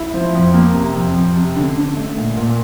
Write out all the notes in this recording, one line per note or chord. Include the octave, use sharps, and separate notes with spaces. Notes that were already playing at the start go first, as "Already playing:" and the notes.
Already playing: E4
F3
F2
A#3
C3
F2
F2
C3
D3
D3
A3
A#2
A#2